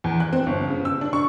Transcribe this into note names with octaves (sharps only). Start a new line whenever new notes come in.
E2
F#6
C4
G1
C#3
E6
D4
C#6